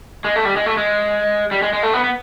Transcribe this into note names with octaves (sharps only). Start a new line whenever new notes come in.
G#3
A3
G3
G#3
A3
G#3
G3
G#3
G#3
A3
B3
B3